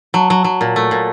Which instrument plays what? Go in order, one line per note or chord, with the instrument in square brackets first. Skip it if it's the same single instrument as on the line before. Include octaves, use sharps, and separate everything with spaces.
[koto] F#3 [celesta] A5
[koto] F#3
F#3
A#2
A3
A#2